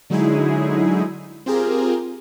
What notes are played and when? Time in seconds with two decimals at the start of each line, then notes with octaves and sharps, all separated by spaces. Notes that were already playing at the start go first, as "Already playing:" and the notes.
0.10 D3 F#3 G#3 D#4 E4 G#4
1.46 C4 F4 G4 G#4 A#4